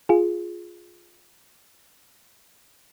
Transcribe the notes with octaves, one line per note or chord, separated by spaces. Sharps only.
F4 G#4